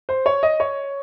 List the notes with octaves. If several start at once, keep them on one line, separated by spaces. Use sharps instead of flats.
C5
C#5
D#5
C#5